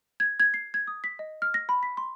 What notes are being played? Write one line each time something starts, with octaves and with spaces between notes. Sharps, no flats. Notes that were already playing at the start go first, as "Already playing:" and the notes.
G#6
G#6
C7
G#6
D#6
B6
D#5
F6
A#6
B5
B6
C6